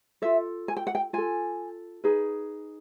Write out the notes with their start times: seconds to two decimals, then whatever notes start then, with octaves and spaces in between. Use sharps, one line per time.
0.22 F4 A4 E5
0.68 G#5
0.77 G5
0.87 F#5
0.95 G5
1.13 F4 A4 G#5
2.04 D#4 G#4 B4